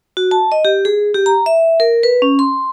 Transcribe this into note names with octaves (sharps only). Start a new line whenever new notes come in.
F#4
A5
D#5
G4
G#4
G4
A#5
E5
A#4
B4
C#4
C6